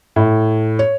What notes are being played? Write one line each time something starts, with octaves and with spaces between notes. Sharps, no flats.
A2
C#5